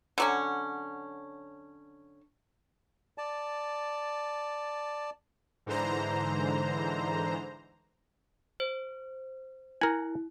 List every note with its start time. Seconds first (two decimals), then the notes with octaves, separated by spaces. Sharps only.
0.18 D3 F#3 C#4
3.18 D5 A5
5.66 G#2 D3 E3 C5 A#5
8.60 C5
9.81 E4 A#4 G#5